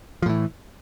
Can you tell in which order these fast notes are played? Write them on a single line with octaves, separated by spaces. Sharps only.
F3 A2 E3